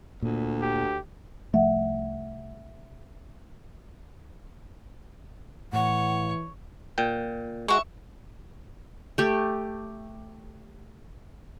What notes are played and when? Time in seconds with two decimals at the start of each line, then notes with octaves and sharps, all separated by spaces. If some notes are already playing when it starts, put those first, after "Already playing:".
0.22 D2 A#2
0.62 G4
1.54 C2 F3 A3 E5 F#5
5.73 A2 E3 C#5 F#5
6.98 A#2 G5
7.68 G#3 F#4 E5 C#6
9.18 A3 G4